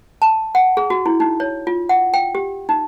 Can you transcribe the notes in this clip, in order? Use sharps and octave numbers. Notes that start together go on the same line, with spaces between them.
A5
F#5
G#4
F#4
E4
D#4
C#5
F4
F#5
G5
G4
D#4